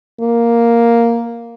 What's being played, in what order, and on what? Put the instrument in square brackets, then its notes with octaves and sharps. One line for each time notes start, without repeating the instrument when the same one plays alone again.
[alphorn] A#3